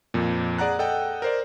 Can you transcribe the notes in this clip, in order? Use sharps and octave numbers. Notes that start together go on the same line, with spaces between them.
F2 A#2
G#4 D5 F#5 A#5 F#6
A4 D#5 F#5 G5
A#4 C5 D5